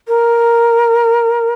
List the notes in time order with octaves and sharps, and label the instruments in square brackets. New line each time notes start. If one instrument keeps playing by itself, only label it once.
[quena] A#4